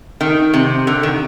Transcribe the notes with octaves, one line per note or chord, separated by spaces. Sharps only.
D#3
C3
D3
D#3